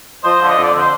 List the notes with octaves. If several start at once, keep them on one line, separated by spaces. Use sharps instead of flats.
F3 C5 D#5
D3
D#5
F2
D5
D3 C5